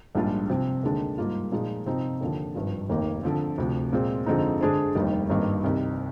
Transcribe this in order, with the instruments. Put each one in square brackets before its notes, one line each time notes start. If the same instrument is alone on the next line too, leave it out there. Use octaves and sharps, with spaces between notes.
[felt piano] A#1 G#2 G3 D4 F4
C3 F3 C4
D#2 D3 G#3 D4
G#2 G3 A#3 F4
A#2 F3 G#3 D#4
C3 F3 C4 D#4
D#2 D3 F3
G#1 G2 F3
F1 D#2 D#3 A#3
D3 F3 C4
D2 C3 F3
A#2 G#3 C4
F2 D3 G#3 C4 D#4
D3 G#3 D4 G#4 C5
F1 D#2 D#3 G3
G#1 G2 D#3 A#3
C2 C3 D#3